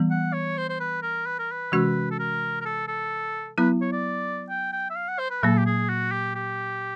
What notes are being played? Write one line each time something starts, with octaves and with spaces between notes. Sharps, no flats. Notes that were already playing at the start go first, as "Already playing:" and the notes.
Already playing: E3 G3 B3
F#5
C#5
C5
C5
B4
A#4
B4
A#4
B4
C3 E3 G#3 C#4 F#4
A4
A#4
A#4
A4
A4
F#3 B3 E4 B4
C#5
D5
G5
G5
E5
F5
F#5
C5
B4
A#2 F#3 A#3 A4
G4
G#4
F#4
G4
G4